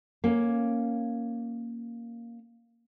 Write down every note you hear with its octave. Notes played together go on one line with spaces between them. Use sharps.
A#3 C#4